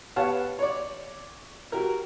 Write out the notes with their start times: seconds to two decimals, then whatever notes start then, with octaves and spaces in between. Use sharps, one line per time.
0.16 B3 G4 C#5 F5 F#5 A5
0.59 C#5 D5
1.72 F#4 G4 A#4